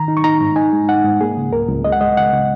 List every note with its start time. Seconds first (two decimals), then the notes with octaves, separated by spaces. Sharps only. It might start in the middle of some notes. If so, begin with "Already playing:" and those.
Already playing: D#3 A#5
0.08 D#4
0.17 C#6
0.24 D#4 A#5
0.41 G#2
0.56 D#4 G#5
0.73 G#3
0.89 D#4 F#5
1.05 G#2
1.21 A#3 G#4
1.37 C#3
1.53 C#2 A#4
1.68 C#2
1.84 G#3 D#5
1.92 F#5
2.01 G#3 D#5
2.17 C#3 F#5
2.32 C#3